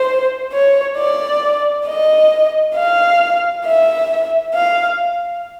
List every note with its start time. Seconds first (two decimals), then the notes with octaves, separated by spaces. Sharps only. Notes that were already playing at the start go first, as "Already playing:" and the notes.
Already playing: C5
0.52 C#5
0.97 D5
1.86 D#5
2.76 F5
3.65 E5
4.55 F5